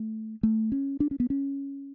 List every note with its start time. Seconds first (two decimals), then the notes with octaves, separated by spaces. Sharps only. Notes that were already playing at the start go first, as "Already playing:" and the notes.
Already playing: A3
0.43 A3
0.72 C#4
1.00 D4
1.11 C#4
1.20 B3
1.30 C#4